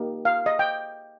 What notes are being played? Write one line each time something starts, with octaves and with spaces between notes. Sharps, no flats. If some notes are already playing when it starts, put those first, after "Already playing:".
Already playing: A#3 D#4 G4
F5
D#5
G5